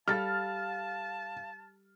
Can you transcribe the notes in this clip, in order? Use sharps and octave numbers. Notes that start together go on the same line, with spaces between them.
G3 A4 F5 A5 F6 A6